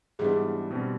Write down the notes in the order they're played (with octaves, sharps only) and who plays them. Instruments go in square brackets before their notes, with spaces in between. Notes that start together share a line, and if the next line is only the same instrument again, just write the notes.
[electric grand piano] G#2 E3 G3 B3 D4 [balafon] G#4
[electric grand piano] B2 G3 C4